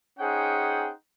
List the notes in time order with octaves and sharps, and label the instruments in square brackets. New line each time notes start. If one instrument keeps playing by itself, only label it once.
[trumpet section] C#4 D#4 G#4 C5 F#5 G5